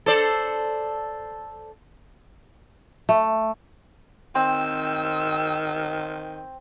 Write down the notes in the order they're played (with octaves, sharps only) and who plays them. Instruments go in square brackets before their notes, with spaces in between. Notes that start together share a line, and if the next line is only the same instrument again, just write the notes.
[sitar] A4 C5 D5
[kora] A3
[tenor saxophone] D#3 [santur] C4 [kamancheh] E6